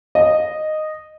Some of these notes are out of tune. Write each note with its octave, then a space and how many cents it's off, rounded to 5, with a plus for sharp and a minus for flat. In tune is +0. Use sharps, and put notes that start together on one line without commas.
D#5 -10